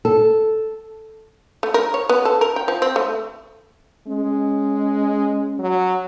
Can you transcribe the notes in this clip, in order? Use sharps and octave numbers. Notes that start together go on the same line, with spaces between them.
A4
A3
A#4
C#5
B3
A4
A#4
G5
F3
C4
A3
G#3 C#4
F#3